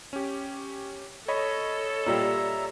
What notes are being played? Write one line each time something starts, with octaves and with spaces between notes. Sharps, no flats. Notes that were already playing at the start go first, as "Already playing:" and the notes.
C#4 G4
A4 C#5 D#5 B5
A#2 G3 E5 A#5